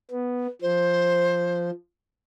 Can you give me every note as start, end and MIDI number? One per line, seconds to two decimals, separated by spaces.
0.11 0.47 59
0.62 1.71 53
0.62 1.70 72